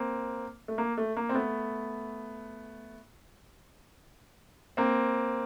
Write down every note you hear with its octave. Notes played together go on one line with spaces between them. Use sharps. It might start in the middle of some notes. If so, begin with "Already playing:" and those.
Already playing: A#3 C4
A3
A#3
A3
A#3
C4
A3 B3
A#3 C4